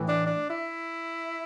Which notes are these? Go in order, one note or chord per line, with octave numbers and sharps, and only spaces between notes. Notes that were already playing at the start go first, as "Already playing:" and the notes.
Already playing: A2 E3
D4
D4
E4